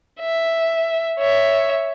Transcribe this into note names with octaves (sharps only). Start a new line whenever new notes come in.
E5
C#5 E5